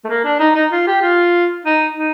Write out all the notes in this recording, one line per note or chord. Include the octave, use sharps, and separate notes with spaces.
A3
A#3
D4
D#4
D#4
F4
G4
F4
D#4
D#4